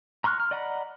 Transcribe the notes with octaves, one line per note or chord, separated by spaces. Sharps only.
A#5 C6 C#6 F6 F#6
F6
D5 D#5 F#5 A#5 B5